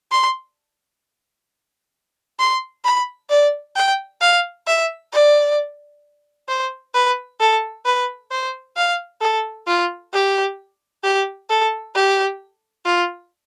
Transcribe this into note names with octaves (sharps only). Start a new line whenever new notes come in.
C6
C6
B5
D5
G5
F5
E5
D5
C5
B4
A4
B4
C5
F5
A4
F4
G4
G4
A4
G4
F4